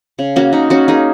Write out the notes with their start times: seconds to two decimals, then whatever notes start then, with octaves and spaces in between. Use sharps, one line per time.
0.19 C#3
0.36 A#3 C#4 F#4
0.53 C#3 D#4
0.70 A#3 C#4 F#4
0.88 A#3 D#4 G#4